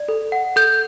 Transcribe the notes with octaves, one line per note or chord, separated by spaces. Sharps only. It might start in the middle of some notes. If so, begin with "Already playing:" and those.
Already playing: D5
A4
F#5
A4 G6